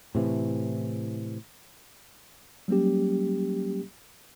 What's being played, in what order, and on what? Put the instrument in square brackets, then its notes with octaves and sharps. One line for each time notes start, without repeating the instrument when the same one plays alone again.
[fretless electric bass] A2 C3 E3
[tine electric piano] F#3 G3 A#3 C#4 G4